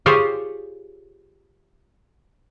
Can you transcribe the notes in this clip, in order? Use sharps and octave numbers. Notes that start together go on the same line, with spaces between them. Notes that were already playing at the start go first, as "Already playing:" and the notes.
F4 G4 G#4 C5 C#5